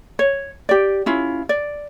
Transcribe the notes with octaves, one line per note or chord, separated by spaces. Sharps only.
C#5
G4 D5
C#4 E4 F4
D5